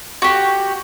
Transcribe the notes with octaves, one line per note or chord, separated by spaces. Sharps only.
F#4 G4